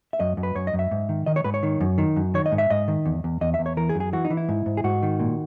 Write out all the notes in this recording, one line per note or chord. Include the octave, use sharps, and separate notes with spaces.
E5
F#2 D#5
F#2
B4
F#2 C#5
D#5
F#2
E5
G#2
D#3
D#3 D#5
C#5
G#2 B4
C#5
D#3
F#2
D#3
F#2
D#3 C#5
D#5
G#2
E5
G#2 D#5
D#3
E2
E2
E2 D#5
E5
E2
C#5
E3 A#4
G#4
F#2
G#4
E3 F#4
D#4
E3
E4
G#2
G#2
G#4
G#2 F#4
D#3
A#2